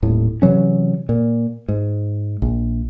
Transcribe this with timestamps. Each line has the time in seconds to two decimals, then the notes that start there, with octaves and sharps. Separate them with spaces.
0.03 D#1 A2
0.42 C3 E3 F#3 C#4
1.09 A#2
1.68 G#2
2.42 A#1